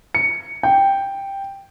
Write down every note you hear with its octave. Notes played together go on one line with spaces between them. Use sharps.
C#7
G5